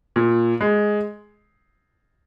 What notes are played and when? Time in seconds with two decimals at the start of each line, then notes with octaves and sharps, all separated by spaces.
0.16 A#2
0.61 G#3